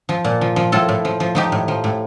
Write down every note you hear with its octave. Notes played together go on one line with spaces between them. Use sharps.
F3
A#2
F3
F3
A2 F4 A4
A2
F3
F3
F3 D#4 G4
A2
F3
A2